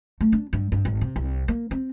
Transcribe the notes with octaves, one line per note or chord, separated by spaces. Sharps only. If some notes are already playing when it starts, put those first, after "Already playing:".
A3
D4
G2
G2
G#1
C3
C2
A#3
C4